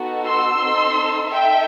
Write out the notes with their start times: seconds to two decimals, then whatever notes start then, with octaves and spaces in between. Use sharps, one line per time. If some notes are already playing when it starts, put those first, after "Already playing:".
Already playing: B3 D#4 F#4 A4
0.25 C6 E6
0.61 C4 D#4 A4
1.32 D#4 A4 E5 G5